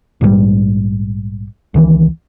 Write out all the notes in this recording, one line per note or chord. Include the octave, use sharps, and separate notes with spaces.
A#1 G#2 C#3 G3
C#2 D#3 E3